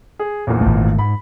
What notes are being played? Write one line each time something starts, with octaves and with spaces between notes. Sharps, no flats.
G#4
A#1 E2 A#2
G#1 A3
G#2 B5